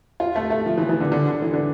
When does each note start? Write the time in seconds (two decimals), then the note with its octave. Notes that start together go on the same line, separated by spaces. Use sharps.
0.20 F4
0.36 A3
0.50 A3
0.66 F3
0.78 E3
0.89 E3
1.00 D3
1.12 D3
1.27 D3
1.42 E3
1.54 D3